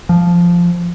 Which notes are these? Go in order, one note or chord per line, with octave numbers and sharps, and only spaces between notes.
F3